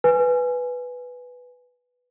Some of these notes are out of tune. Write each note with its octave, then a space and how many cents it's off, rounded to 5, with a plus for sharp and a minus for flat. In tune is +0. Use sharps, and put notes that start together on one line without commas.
B4 +0 G#5 +0